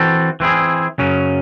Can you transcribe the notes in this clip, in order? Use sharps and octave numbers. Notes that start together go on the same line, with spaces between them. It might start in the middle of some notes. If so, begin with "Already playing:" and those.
Already playing: E3 C4 F#4 A4
E3 C4 E4 G#4
F#2 C#3 F#3 C#4